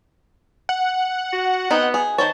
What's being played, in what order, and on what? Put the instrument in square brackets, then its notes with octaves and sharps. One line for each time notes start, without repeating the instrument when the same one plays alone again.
[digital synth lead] F#5
[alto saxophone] F#4
[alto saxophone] B3 [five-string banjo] C4 D#4
[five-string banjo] G#4
[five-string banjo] D#3 C5 C#5 [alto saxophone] A5